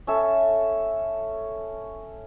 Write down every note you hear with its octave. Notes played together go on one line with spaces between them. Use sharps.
C#4 A4 E5